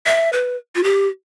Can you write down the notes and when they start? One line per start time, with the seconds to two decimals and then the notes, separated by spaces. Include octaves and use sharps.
0.06 E5
0.33 B4
0.75 F4
0.84 G4